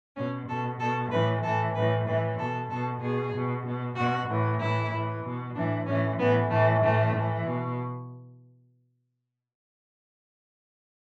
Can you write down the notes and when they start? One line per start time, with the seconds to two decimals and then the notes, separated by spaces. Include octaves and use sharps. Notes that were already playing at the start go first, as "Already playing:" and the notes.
0.16 B2 C#4
0.49 B2 A4
0.80 B2 A4
1.11 A2 E3 B4
1.43 A2 E3 A4
1.75 A2 B4
1.80 E3
2.07 A2 E3 B4
2.39 B2 A4
2.70 B2 A4
3.02 B2 G#4
3.34 B2
3.66 B2
3.96 B2 F#4
4.28 A2 E3
4.61 A2 E3 E4
4.92 A2 E3
5.24 B2
5.55 A2 E3 D4
5.86 A2 E3 C#4
6.19 A2 E3 B3
6.50 A2 E3 A3
6.82 A2 E3 A3
7.13 A2 E3
7.45 B2